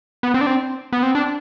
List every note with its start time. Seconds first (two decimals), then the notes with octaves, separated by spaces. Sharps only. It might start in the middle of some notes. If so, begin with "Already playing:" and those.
0.23 B3
0.34 C4
0.41 D4
0.47 C4
0.93 B3
1.03 C4
1.15 D4